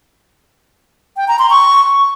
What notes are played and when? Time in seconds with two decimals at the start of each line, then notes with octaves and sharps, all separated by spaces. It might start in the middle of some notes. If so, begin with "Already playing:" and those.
1.17 G5
1.28 A#5
1.39 C6
1.50 C#6